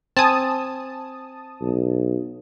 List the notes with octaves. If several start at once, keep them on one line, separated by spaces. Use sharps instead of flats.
C4 G#5 A5 D#6
B1